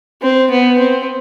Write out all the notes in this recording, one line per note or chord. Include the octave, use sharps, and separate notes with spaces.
C4
B3
C4